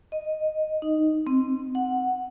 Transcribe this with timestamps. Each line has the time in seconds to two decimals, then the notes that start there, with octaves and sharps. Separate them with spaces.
0.12 D#5
0.82 D#4
1.27 C4
1.75 F#5